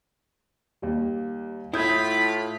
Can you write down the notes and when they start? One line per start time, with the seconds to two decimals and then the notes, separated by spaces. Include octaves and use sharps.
0.82 D#2 G3
1.74 A2 E4 F4 B5 D#6 G6 G#6